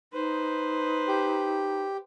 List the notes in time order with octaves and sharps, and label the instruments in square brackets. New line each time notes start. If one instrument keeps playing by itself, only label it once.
[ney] D#4 [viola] B4 C5
[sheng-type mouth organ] G4